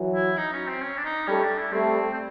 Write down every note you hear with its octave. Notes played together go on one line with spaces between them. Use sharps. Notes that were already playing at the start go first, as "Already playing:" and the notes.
Already playing: E3 F#3
E4
D#4
C#4
C4
C#4
D4
D#4
G3 A3 C#4
D4
E4
G3 A3 C4
C4